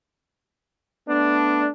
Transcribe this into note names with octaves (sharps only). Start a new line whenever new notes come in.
A3 B3 D4